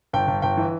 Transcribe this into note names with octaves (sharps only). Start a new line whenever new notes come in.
G1 G5
G1
G1 G5
E3